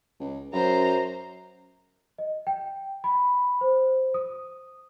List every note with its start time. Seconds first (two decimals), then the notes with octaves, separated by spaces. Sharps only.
0.20 C#2
0.53 F#2 C5 A#5
2.18 D#5
2.47 G5
3.04 B5
3.61 C5
4.14 D#6